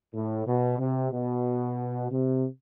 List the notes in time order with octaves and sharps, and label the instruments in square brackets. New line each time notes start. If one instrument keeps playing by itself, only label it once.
[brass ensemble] A2
B2
C3
B2
C3